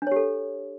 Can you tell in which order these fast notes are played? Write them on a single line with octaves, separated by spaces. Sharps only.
D4 C#5 G4 A4